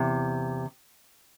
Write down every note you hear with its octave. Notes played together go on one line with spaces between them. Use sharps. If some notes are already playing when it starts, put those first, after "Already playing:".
Already playing: E2 C3